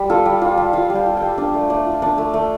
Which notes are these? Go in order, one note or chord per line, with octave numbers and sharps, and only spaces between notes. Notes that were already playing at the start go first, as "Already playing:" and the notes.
Already playing: G3
F4 A4
G3
F4 D5
G3
F4 F5
G3
G5
F4
G5
G3
D4 F5
A3
A3 D5
F4
D4 D5
A3
A3